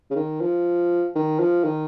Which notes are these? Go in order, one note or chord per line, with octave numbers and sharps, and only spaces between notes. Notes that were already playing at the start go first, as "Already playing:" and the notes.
C#3
D#3
F3
D#3
F3
D#3